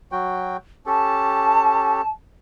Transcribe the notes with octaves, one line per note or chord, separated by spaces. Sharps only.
F#3 F#4 G5
C#4 G4 A4 A5